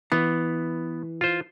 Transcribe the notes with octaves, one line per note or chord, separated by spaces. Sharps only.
E3 B3
F4 C5